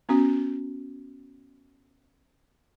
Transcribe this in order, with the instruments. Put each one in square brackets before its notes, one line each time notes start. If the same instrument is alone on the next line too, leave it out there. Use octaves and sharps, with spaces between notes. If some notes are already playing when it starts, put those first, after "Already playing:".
[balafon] B3 C#4 F#4